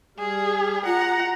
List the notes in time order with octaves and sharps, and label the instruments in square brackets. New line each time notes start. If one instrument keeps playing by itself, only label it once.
[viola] G3 [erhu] G#4
[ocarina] F4 [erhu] F#5 [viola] A#5